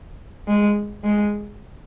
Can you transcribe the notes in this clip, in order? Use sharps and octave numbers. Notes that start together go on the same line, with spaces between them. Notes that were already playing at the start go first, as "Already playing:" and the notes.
G#3
G#3